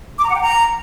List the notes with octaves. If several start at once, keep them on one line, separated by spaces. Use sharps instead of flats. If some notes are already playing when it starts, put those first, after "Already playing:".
D6
A#5
F#5
G5
A#5